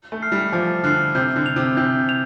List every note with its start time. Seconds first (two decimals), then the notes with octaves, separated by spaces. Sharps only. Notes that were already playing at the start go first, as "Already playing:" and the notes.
0.12 A3
0.22 F6 C7
0.32 G3
0.53 F3 D6
0.84 D3 F6 C7
1.15 C3 G6
1.36 D3
1.46 F7
1.56 C3
1.77 C3 G6
2.09 F7